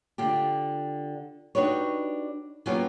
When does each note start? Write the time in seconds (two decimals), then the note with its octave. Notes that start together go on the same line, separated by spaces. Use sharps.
0.18 D3 F4 G4
1.55 D4 D#4 F#4 G4 B4 C#5
2.66 F#3 A#3 B3 C#4 F4 G4